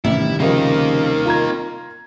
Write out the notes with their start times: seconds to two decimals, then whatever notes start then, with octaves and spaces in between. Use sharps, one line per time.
0.05 A1 C3 D#3 G3 E4
0.40 C#3 F3 A#3 D#4 A#4
1.26 F4 A#5 G#6